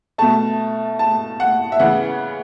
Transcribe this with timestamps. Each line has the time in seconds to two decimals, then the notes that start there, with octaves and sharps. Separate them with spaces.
0.18 B2 A3 A5
0.99 A5
1.40 F#5
1.72 E5
1.79 C#3 E3 B3 F#5